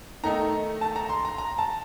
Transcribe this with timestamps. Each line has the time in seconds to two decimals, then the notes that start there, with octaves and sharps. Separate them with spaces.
0.24 D#3 A3 D#4 A#5
0.81 A5
0.96 A#5
1.09 C6
1.25 A#5
1.38 A#5
1.58 A5